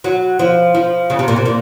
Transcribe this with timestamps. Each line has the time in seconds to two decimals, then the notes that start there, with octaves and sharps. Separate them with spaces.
0.04 F#3
0.39 F3
0.74 F3
1.10 C#3
1.19 C3
1.28 A#2
1.36 C3
1.45 A#2